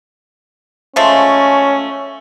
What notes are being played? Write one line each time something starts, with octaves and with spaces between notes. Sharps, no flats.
F3 G#3 A3 C#4